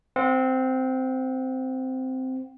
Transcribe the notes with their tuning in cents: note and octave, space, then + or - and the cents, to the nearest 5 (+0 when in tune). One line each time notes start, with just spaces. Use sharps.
C4 -10 F#5 -40